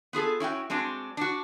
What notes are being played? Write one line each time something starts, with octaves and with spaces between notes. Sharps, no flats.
B3 F4 G#4 A4
C#4 E4 F#4 G5
G#3 C4 D4 F#4
D4 F#4